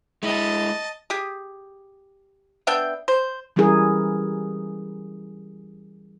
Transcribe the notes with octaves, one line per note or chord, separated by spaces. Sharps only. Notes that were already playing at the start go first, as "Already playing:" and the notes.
G#3 E4 D#5 A5
G4 G#4
B3 D4 E5 G5
C5
E3 G3 C#4 E4 G#4 A#4